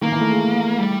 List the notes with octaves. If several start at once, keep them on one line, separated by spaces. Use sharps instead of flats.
D#3 A#3
E3
A3
G#3
G3